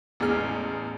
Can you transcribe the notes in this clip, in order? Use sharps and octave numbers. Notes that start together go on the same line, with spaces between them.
A1 E2 G#3 G#4 F6